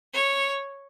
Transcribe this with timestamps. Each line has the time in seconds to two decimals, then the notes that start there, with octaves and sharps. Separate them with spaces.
0.14 C#5